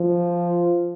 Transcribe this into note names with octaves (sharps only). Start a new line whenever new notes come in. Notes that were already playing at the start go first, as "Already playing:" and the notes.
Already playing: F3